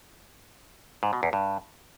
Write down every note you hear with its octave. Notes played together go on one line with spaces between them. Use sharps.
G#2
B2
E2
G2